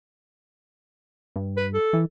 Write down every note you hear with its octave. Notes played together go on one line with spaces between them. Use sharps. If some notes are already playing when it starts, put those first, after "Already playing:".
G2
B4
A4
E3